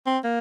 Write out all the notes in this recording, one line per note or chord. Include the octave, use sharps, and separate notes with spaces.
C4
A#3